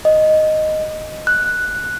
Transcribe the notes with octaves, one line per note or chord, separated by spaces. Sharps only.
D#5
F#6